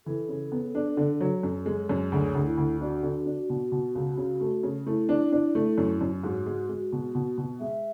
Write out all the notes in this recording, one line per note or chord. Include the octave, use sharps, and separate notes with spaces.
E3 A4
C#3
B3
D4
D3
F#3
F#2
G#3
F#2
D2 G#4
D2
E4
D2
D4 F#4
D3
D4
B2
B2
C#2
C#3
A3
C#3
A3 E4
D4
D4
A3
F#2
F#2
G#2 F#4
G#3
G#3
B2
B2
B2
G#3 E5